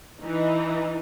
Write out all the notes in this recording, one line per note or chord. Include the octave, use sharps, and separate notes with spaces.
E3 D#4